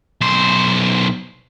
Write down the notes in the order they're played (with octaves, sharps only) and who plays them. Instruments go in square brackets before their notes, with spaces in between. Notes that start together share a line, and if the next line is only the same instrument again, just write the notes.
[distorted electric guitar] B1 C5